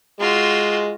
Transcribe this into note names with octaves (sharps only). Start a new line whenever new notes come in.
G#3 F4 F#4